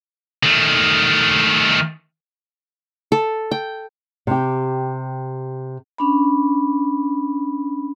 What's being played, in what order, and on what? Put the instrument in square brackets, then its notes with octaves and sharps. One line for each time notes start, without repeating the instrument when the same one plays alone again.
[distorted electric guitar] D#3 A3
[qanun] A4
G5
[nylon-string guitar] C3 G4
[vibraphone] C#4 D4 B5